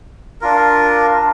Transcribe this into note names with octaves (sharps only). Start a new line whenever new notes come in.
D4 F4 A#4